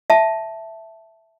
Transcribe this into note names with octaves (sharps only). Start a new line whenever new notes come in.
E5 A5